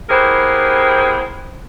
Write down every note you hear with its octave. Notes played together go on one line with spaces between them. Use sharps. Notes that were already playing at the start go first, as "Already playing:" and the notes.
B3 E4 G4 G#4 A#4 C5